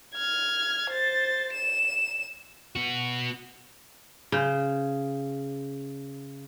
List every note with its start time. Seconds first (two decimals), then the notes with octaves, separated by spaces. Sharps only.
0.14 F6 G#6
0.90 C5 A6
1.53 E7
2.76 B3 F#4
4.32 C#3 C5